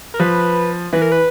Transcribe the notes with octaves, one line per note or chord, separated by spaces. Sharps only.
A#4
F3 B4
E3 B4
A#4
B4